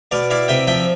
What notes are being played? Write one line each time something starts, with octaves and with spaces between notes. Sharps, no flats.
B2 D5 F5
E4 D5 F5
C3 E5 G5
F3 E5 G5